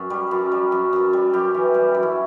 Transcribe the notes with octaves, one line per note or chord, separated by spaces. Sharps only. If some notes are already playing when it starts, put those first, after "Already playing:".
Already playing: F#2
G3
F#2
G3
F#2
F#2
G3
F#2 G4
E3
G3
F#2
E4